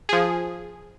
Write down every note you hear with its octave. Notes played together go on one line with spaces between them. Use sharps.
F3 G#4